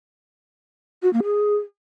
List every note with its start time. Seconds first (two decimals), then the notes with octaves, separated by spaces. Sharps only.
1.03 F#4
1.13 A#3
1.24 G#4